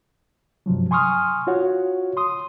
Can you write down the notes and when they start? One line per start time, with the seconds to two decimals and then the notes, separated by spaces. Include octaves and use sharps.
0.66 G2 C3 F3 F#3
0.91 G#5 C6 C#6 D#6 F6
1.47 F4 F#4 C#5 F#5
2.17 C6 D#6